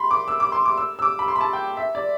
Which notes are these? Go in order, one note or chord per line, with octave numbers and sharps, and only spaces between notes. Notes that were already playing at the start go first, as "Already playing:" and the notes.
Already playing: B5 C6
D6
E6
D6
C6
D6
E6
E6
D6
B5
C6
B5
A5
G5
E5
D5